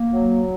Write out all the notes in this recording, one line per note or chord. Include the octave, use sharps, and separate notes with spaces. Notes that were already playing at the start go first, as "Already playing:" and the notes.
Already playing: A#3
F#3